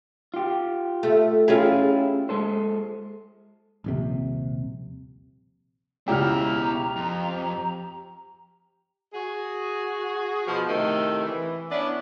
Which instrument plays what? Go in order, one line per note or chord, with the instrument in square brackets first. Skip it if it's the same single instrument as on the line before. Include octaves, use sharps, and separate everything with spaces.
[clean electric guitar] F4 G4
[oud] A3
[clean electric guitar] C#4 E4 G4 [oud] F4 G#4
[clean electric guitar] G#3 A4 C5
[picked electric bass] D#1 A#1 C3
[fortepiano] C#2 [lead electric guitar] B2 E4 [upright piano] G4 F6 [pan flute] A#5
[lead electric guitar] F2
[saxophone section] F#4 G#4
B2 F3
A2 C3 D#3 A3
E3
B3 C#4 D4 E4 D5